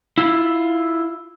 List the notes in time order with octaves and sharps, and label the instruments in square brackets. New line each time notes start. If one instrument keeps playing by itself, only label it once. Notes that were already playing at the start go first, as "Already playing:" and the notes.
[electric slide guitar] E4 F4